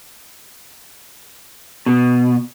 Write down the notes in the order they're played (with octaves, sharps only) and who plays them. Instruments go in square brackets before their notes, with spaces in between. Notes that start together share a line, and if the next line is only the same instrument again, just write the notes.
[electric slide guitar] B2